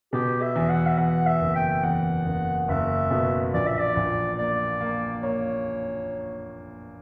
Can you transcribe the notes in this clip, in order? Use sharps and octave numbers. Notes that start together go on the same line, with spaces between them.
B2 G4
E5
E2
F#5
E5
E2 F#5
E5
F#1
G5
E2 F#5
F#1
F#1 E5
B2
A#1 D5
E5
D5
A#1
A#3 D5
A#3
A#3 C#5